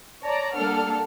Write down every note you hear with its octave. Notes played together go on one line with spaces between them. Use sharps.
C#5 D5 A5 A#5
G3 A#3 D4 A4 F#5 F6